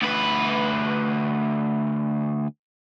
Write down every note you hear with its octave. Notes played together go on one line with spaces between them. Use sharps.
D2 B4